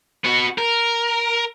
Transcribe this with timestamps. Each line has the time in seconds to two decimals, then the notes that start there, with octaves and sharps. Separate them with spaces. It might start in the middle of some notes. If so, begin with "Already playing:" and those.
0.25 B3 F#4
0.58 A#4